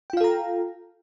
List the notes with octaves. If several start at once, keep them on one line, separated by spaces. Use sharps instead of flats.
F4 A4 F5 G5 A#5